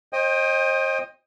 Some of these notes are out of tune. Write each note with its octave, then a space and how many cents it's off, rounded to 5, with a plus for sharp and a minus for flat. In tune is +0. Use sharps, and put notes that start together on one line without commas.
C5 +35 D#5 +0 G5 +20